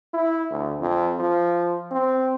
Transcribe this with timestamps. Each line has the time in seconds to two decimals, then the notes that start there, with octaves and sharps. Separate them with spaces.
0.14 E4
0.50 D2
0.80 F2
1.19 F3
1.91 C4